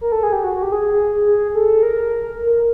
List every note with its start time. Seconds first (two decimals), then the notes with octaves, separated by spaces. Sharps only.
0.01 A#4
0.12 A4
0.23 G#4
0.33 G4
0.44 F#4
0.54 F#4
0.62 G4
0.72 G#4
1.55 A4
1.83 A#4